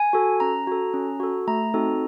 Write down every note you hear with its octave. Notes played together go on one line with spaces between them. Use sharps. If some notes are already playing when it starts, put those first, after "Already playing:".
Already playing: G#5
F#4 A4
C#4 A#5
F#4 A4
C#4
F#4 A4
A3 A#5
C4 D#4 F#4 A4